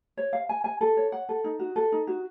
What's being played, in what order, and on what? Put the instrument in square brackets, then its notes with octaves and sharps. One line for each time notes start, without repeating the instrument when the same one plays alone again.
[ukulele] C#5
F5
G#5
G#5
A4
C#5
F#5
A4
D#4
F#4
A4
D#4
F#4